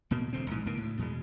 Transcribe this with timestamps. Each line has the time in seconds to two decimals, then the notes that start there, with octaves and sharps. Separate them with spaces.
0.11 D1 B2 A#3
0.33 E1 D2 A2 C4
0.51 A#1 G#2 E3
0.65 C#2 G#2 B2 A#3
0.77 D2 A2
0.99 E2 B2 G#3